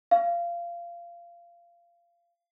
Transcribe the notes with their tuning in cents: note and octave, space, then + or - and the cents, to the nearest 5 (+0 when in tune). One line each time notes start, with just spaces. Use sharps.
F5 -20